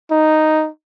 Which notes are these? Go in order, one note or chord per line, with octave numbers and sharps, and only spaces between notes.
D#4